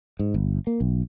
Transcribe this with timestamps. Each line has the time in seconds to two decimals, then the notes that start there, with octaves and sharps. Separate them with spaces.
0.19 G#2
0.34 G1
0.67 A#3
0.81 B1